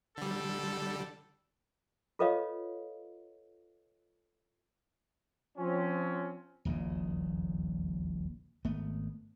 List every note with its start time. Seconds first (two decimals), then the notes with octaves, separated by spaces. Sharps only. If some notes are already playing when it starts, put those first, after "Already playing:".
0.17 D3 G3 A4
2.19 F4 A4 B4 C#5 D#5 F5
5.58 F3 C4 C#4
6.65 D#1 A#1 E2 C#3
8.65 G#1 A3 B3